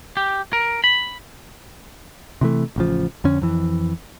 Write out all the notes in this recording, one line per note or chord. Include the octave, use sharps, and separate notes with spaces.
G4
A#4
B5
C3 E3 A3
A1 C#3 F3
F2 D3 C#4
F2 E3